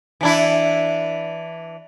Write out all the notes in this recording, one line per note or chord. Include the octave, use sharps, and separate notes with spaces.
E3 D4 E4